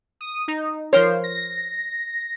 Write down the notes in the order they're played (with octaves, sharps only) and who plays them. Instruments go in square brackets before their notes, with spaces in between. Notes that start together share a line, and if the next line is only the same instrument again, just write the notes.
[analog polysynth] D#6
D#4
[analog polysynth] F3 C5 [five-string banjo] A#4 C#5
[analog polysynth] A#6